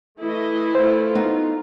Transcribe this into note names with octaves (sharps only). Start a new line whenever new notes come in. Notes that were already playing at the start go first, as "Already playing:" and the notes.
E3 A3 E4 D#5
A3 F4 C5
B3 D#4